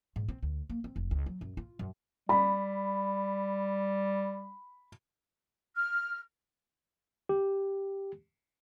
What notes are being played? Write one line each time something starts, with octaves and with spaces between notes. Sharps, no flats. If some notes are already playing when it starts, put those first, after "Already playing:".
G#2
C4
D2
A#3
C4
F1
C#2
F#3
F#2
F4
F#2
G3 B5
F6
G4